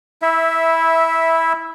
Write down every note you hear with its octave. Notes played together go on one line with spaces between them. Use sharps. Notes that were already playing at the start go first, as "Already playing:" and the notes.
E4 E5